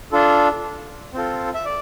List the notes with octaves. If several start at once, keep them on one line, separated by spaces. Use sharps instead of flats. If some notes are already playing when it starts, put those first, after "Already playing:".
D4 F4 A4
C4 F4 A4
E5
D5